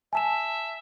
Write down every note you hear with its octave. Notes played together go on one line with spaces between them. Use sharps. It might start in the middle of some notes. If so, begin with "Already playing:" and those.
E5 G#5 A5 E7